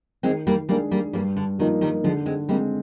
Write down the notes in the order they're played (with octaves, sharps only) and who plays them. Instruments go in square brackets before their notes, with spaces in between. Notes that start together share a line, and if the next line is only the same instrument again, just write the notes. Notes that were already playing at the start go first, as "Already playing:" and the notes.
[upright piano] D#3 [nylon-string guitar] G#3 C4
[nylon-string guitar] G3 A#3
[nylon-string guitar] G3 A#3 [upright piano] G#3 D4 G#4
[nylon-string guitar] G3 A#3
[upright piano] G2 [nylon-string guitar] G3 A#3
[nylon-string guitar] D3
[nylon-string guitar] D#3 [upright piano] F3 A#3 D#4
[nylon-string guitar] D#3 G3
[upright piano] D3 [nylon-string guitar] F3 G#3
[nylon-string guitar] G#3 C4
[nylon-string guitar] G3 A#3 [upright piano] G#3 C4